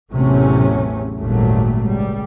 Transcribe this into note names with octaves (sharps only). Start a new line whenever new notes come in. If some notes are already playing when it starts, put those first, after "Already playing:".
A1 E2 C3 F#3 A3 C#4
G#1 D#2 A#2 F#3 G3 A3
C#2 G3